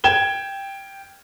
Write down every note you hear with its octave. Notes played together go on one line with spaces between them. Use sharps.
G5 G#6 E7 G7